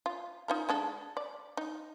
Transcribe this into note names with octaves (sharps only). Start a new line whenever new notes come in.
F4
D#4 F4 A#4
G#3 D4 A4
D5
D#4